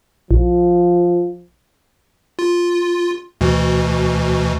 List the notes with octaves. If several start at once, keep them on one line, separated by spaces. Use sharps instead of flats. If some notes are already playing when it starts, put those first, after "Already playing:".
A#1 F3
F4
D2 B2 E3